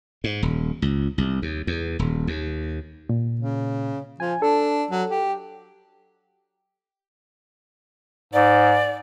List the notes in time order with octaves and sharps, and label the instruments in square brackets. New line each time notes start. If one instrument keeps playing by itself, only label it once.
[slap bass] G#2
D#1
C#2
C2
D#2
E2
D#1
D#2
[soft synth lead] A#2
[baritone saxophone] C#3
[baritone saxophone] F3 [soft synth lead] G#5
[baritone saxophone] D4 [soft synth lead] A4
[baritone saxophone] F#3
G4
[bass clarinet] G#2 [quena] D5